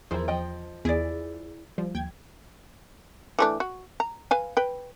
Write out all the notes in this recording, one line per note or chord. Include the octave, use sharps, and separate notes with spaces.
E2 F3 E4 G#4 A#4 C5
F3 D#5 G5
E2 E4 G#4 D5
F3 G3
D#2 G5 G#6
E3 A3 D4
F#4
A#5
B4 F5 G#5
B4 G5